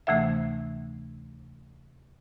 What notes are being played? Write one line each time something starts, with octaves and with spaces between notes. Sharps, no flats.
D2 C3 E3 A3 E5